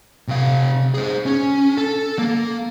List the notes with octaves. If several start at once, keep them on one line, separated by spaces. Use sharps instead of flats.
C3 F5
G#4 C5
C#4
A4
A#3